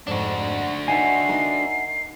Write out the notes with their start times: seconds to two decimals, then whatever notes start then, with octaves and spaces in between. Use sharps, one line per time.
0.07 F2 G#2 D4 F#4
0.88 D#4 E5 F#5 G#5 C7
1.29 D#4 A#4